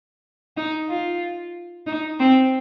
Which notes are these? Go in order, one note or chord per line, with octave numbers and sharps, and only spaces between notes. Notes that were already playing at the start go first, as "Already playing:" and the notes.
D#4
F4
D#4
C4